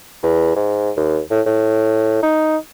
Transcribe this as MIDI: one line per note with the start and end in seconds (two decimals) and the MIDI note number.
0.23 0.52 40
0.56 0.90 44
0.97 1.19 39
1.31 1.41 45
1.46 2.21 45
2.23 2.57 63